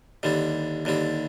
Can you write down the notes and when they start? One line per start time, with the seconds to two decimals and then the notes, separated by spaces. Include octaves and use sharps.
0.23 D#2 D3 G3 C4
0.85 D#2 D3 G3 C4